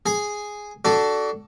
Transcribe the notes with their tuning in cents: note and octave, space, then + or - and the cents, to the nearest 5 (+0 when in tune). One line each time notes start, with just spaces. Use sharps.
G#4 +0 G#5 +0
D4 +0 F#4 +25 A4 +0